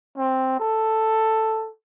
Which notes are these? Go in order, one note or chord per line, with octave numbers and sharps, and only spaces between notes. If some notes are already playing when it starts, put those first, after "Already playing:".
C4
A4